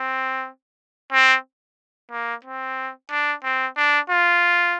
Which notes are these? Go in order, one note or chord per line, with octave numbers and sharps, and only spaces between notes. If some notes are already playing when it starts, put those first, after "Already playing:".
Already playing: C4
C4
A#3
C4
D4
C4
D4
F4